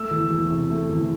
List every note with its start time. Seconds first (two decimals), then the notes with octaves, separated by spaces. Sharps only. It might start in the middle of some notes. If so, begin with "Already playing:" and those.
Already playing: A3 E6
0.11 E2
0.30 E2
0.51 C3
0.70 A3
0.89 E2